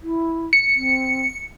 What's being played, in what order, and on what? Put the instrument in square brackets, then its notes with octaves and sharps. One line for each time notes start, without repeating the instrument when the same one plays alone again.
[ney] E4
[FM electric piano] C#7
[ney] C4